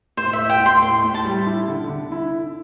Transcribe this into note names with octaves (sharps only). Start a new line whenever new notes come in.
A2 C5
E5
A2
G5
A2
C6
A2 C6
A2
A5
G3
E4
D3
D3
E4
E4